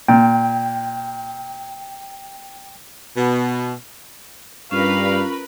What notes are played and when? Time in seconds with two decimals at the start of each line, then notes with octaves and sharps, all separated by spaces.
0.08 A#2 G5
3.16 B2
4.71 G2 C#4 F4 A#4 B4 F5 B5